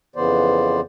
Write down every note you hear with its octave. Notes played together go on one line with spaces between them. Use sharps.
F2 C#3 E3 B3 C5 D5